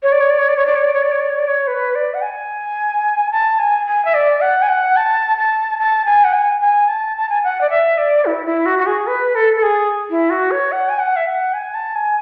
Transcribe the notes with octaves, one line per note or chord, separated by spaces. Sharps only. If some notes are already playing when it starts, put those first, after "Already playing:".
C#5
D5
C#5
D5
C#5
D5
C#5
D5
C#5
D5
C#5
D5
C#5
D5
C#5
D5
C#5
B4
D5
F#5
G#5
A5
G#5
G#5
E5
D5
F#5
G#5
F#5
A5
A5
A5
G#5
F#5
G#5
G#5
A5
A5
G#5
F#5
D5
E5
D5
E4
E4
F#4
F#4
G#4
B4
A4
A4
G#4
E4
F#4
C#5
F#5
G#5
F#5
E5
F#5
G#5
A5
G#5